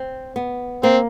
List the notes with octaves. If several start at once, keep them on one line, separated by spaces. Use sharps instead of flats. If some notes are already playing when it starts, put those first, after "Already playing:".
Already playing: C4
B3
A#3 C4